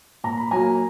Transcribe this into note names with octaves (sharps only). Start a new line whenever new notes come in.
A#2 A#5
B5
F#3 A#3 G#5 A#5